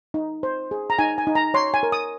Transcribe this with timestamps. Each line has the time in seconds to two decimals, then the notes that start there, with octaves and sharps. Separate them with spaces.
0.14 D#4
0.43 C5
0.71 G#4
0.90 A#5
0.99 D#4 G#5
1.18 G#5
1.27 D#4
1.35 A#5
1.54 C#5 C6
1.74 G#5
1.83 A#4
1.92 D#6